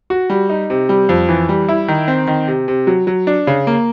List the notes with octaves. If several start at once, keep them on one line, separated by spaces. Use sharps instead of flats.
F#4
G3
D#4
C3
G3
F2
E3
G3
E4
D#3
C4
D#3
C3
C3
F#3
F#3
D4
C#3
A#3